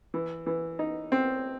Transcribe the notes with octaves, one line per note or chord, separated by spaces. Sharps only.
E3
E3
D#4
C4